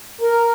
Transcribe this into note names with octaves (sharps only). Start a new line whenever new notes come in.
A#4